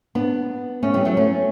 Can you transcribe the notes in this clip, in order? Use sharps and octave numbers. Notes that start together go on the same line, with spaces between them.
B3 D4
A3 C#4
E3 G3
F#3 A3
A3 C#4